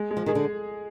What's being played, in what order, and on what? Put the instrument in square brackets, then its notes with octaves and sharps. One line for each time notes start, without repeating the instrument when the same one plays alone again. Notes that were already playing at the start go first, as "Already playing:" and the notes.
Already playing: [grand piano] G#3
G#3
[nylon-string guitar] F3
[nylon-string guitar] D#3 [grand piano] G#4
[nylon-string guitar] D3